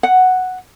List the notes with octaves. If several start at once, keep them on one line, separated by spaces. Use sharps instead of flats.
F#5